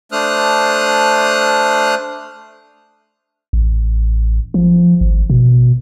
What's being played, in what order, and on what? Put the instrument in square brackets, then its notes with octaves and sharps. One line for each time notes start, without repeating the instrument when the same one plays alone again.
[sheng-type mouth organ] A3 D4 C5 D#6 F6 F#6
[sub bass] A1
F3
G#1
B2